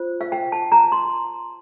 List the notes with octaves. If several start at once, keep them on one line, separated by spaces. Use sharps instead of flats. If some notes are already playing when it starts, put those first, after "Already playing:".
Already playing: F4 C5
F5
G5
A5
A#5
C6